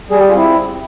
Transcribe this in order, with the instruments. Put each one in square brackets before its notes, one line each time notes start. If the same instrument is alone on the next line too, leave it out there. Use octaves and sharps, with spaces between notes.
[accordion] G3 G#4
G4
F4
C4 E4